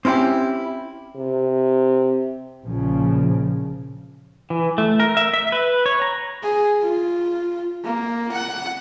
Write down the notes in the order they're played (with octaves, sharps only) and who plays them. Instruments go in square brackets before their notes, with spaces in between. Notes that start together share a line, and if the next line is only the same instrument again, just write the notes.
[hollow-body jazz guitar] C4 C#4 E4 F4 G4
[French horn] C3
[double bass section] A#1 A#2 C#3 F3
[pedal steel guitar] E3
A3
A#4
E5
E5
B4
C#5
A#5
[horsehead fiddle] G#4
F4
A#3
F#5